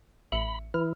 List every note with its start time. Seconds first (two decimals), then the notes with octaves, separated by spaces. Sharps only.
0.32 A1 E5 B5 C#7
0.74 E3 E4 F6